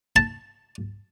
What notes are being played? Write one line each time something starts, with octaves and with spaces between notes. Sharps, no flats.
A5